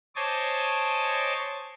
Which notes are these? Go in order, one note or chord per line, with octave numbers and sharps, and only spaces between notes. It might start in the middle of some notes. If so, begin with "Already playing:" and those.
C5 C#5 D#5 G#5 A5 D6